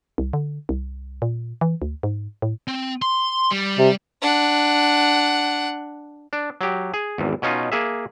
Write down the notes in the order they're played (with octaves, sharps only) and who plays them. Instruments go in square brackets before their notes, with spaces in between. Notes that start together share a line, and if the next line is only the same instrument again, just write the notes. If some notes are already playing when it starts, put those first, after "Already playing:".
[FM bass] C2
D3
C2
A#2
E3
D2
G#2
A2
[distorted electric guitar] C4
C6
G3
[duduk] C3
[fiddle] D4 F#5
[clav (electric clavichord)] D4
F#3 G4
G#4
G#1 E2
B2 C#4 D#4 F4
A#3 G#4 E5